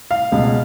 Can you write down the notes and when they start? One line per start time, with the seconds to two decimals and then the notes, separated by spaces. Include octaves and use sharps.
0.11 F5
0.32 C#2 B2 G#3